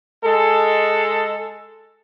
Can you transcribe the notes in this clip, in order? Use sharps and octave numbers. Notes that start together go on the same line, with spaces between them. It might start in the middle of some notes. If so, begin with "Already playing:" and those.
G#3 A4